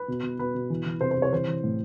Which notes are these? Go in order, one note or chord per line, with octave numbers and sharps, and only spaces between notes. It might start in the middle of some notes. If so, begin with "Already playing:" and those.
Already playing: B4
B2
B2
B2 B4
B2
E3
E3
C3 C5
C5
C3
C#5
E3 C5
E3
A2